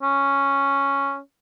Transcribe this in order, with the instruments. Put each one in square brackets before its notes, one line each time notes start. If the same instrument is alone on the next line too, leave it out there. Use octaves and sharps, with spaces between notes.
[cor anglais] C#4